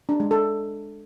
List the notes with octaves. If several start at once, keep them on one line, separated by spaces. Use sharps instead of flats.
D4
G#3
A4